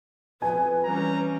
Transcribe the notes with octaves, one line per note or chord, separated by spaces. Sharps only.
F2 B4 G#5
E3 G3 C#4 A#5